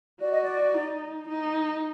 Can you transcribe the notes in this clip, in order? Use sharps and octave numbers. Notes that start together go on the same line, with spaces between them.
F#4 D5
D#5
D5
D#4
D#4